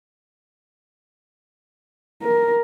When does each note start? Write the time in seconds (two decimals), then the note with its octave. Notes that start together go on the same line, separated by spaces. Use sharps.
2.23 A#4